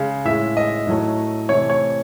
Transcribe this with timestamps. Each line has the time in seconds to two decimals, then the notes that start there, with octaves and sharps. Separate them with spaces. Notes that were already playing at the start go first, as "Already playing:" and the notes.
Already playing: C#3 G#3
0.25 A2 G#3 E5
0.57 D#5
0.87 A2 F#3 A3
1.49 C3 E3 A3 C#5
1.70 C#5